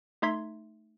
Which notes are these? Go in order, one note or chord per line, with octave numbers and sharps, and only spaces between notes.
A3 D#4 E5 C6 G#6 B6